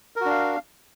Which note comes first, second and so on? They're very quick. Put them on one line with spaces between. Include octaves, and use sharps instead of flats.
A#4 F#4 D4 F5